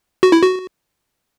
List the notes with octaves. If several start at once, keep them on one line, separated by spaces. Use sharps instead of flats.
F#4
E4
F#4